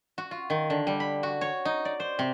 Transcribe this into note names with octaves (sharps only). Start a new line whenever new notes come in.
F#4
F4
D#3
D3
G3
B5
F#4
C#5
D#4
D5
C5
C3